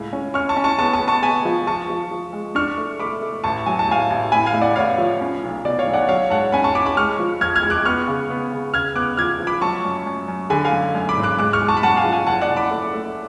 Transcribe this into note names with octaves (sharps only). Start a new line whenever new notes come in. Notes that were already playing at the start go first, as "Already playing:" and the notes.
Already playing: C#2 A2
C#4
C#4 C#6 F6
A5 C#6
C#4
A5 C#6
B3 A5 C#6
A5 C#6
B3
A5 C#6
B3 G#5 B5
F3
F3 A5 C#6
F3
F3
G#3
D4 C#6 F6
A3
A3 B5 D6
A3
A1 A5 C#6
F#3 G#5
A5
A1 F5 G#5
A1
A2 G#5 B5
F5 G#5
A2
D5 F#5
A1 C#5 F5
F3
C#4
B1
B2 D5
C#5 F5
B1
D5 F#5
F#3 C#5 F5
G#2 F#5 A5
C#4 G#5 B5
A5 C#6
C#4 B5 D6
B5 D6
G#3 C#6 F6
F3
F2 F6 G#6
F6 G#6
G#3
D6 F#6
B3 C#6 F6
C#3
B3
C#3
C#3 F6 G#6
B3 D6 F#6
F3 F6 G#6
F3
B5 D6
F#3 A5 C#6
F#2
F#2
F#2
D3 G#5 B5
F5 G#5
F#2
F#2
B5 D6
G#1
D6 F#6
G#3 D6 F#6
C#6 F6
G#3
A5 C#6
B5
F#2 F#5 A5
F5 G#5
F3
F5 G#5
F#1 F#5 A5
D5 F#5
F#1
B5 D6
A3
A3